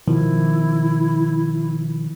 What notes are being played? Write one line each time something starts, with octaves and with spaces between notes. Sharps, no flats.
B2 D#3 F3 E4